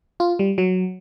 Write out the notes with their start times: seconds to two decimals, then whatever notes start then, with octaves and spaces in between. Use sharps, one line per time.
0.20 F4
0.39 G3
0.58 F#3